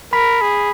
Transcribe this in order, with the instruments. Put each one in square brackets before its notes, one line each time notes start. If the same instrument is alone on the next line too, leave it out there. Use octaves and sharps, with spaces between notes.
[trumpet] A#4 [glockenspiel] B5 B6
[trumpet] G#4